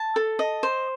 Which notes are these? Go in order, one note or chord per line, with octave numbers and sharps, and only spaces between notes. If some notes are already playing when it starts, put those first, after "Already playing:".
Already playing: A5
A4
D#5
C5